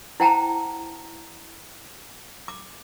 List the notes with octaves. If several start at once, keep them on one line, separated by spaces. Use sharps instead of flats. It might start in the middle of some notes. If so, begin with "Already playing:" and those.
E4 C5 F#5 G5 A5 A#5
D6